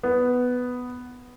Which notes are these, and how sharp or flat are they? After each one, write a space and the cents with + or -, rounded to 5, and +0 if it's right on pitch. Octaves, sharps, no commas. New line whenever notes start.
B3 +5